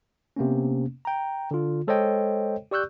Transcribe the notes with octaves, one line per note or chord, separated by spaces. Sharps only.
C3 A#3 B3 C#4
G5 A#5
D3 F4
G#3 A4 C5 C#5 D#5 G5
G4 D5 C#6 E6 F#6 G6